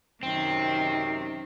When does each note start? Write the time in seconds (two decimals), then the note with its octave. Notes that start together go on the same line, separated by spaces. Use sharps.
0.23 F#2 C3 D#3 C4